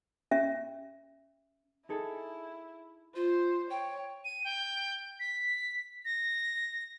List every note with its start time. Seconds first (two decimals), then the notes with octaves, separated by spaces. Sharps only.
0.31 C#4 E5
1.89 D#4 E4 G#4 A4
3.15 F4 C5
3.70 C#5 G5
4.25 D#7
4.44 G5
5.20 B6
6.05 A#6